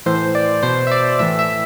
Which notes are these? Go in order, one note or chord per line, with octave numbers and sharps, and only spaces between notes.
A2 E3 C5
D5
B2 C5
E5
D5
A2 E3 E5
E5